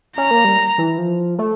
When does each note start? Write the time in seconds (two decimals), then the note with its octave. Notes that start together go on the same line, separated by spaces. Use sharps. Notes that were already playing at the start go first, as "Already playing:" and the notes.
0.17 C#4 A#5
0.31 A#3
0.45 G3
0.78 E3
0.98 F3
1.39 A3